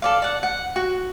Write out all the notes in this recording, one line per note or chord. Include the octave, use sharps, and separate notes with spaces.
A4 D5 F5
D5 F#5
F#5
F#4